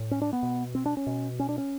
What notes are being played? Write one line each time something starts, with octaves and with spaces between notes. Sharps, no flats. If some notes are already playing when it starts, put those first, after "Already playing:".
Already playing: A2
C#4
D4
B3
B2
C4
D4
C#4
B2
C#4
D4
C#4